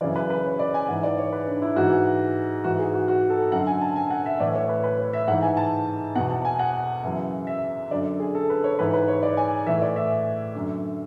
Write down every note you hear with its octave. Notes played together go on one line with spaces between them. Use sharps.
F#2 C#3 E3 D5
B4
B4
C#5
D5
G#5
G#2 E3 F#5
D5
C#5
B4
D4
E4
G#2 E3 F#4
G#2 E3 F#4
G#4
F#4
F#4
A4
F#2 D3 F#5
G#5
A5
G#5
F#5
E5
A2 E3 D5
C#5
B4
B4
C#5
E5
G#2 E3 F#5
G#5
A5
E2 B2 F#5
A5
G#5
F#5
F#2 C#3 E3
E5
F#2 D3 D5
G#4
A4
B4
C#5
G#2 E3 B4
B4
C#5
D5
G#5
A2 E3 E5
D5
E5
F#2 D3